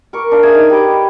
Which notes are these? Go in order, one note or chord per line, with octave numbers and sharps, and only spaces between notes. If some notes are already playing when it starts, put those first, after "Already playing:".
A#4 C#6 D6
D4 F5
G#4 D5 E5 G#5
D#4
G4 B4 D#5 D6